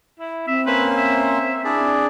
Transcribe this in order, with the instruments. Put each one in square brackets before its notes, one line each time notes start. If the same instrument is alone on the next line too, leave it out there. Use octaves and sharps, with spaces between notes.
[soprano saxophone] E4
[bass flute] C4 [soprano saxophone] E5
[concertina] A#3 C#4 C5 [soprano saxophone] B4
[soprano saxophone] E5
[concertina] D4 G#4 D5 [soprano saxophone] E4